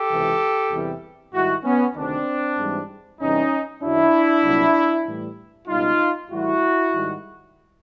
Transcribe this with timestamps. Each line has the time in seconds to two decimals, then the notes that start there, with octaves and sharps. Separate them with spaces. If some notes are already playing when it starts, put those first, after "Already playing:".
Already playing: G4 A4
0.09 C#2 C3 E3
0.71 E2 C3 E3 G3
1.33 G#2 D#3 G3 E4 F#4
1.64 B3 C#4
1.95 D2 C3 D#3 C4 D4
2.58 G#2 E3 G3
3.19 E2 C3 E3 G3 C#4 D#4
3.81 F#2 D#3 F#3 D4 E4
4.43 C2 A#2 F#3
5.05 A2 E3 G3
5.67 C#2 B2 G3 D#4 F4
6.30 A2 E3 G3 E4 F#4
6.92 G#2 D#3 G3